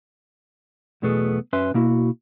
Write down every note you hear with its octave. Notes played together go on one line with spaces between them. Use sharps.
B1 E2 B2 A3 B3 G#4
F#2 C#4 B4 E5 C6
B2 A#3 E4 F#4